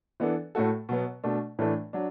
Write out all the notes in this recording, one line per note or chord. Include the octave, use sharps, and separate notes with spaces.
E3 B3 D4 A4
A2 A3 F#4 A4
B2 F#3 B3
B2 A3 D4
A2 E3 A3 D4
F#3 D4